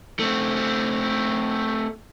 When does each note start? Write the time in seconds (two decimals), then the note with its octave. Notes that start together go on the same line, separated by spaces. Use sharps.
0.20 A3 C4